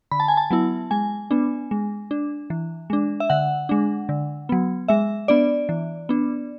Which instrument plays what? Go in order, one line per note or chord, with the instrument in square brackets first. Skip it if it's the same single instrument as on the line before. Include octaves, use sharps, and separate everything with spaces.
[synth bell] D3 B5
A5
G#5
A5
F#3 B3 E4
G#3 G#5
B3 D4
G#3
D4
E3
G#3 D4
E5
D3 F#5
G#3 D4
D3
F#3 B3
G#3 E5
B3 D4 D5
E3
B3 D4